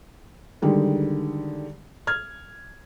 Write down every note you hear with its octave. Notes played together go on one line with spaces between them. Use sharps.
D3 D#3 G3 G#3
F6 G#6